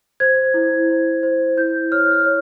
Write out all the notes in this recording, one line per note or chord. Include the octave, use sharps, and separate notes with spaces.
C5 G#6
E4
C5
C5
E4 G6
C#5 F6
C#5